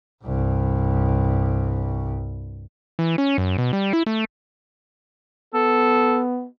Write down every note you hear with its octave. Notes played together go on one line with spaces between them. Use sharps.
C2 G2
E3
C#4
F#2
B2
G3
E4
A3
B3 A4